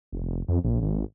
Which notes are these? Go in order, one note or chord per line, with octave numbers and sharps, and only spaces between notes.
F1
F2
A#1
G#1